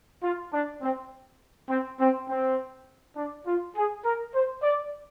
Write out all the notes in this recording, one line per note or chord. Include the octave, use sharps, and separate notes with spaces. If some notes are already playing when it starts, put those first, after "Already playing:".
F4
D4
C4
C4
C4
C4
D4
F4
G#4
A#4
C5
D5